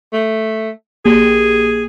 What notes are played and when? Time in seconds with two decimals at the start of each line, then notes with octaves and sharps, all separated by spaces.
0.13 A3
1.05 A#1 A#3 G4 G#4